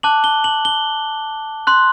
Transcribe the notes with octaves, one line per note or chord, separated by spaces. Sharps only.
A5 D6 F#6 F#7
G7
F#7
G7
C6 F#6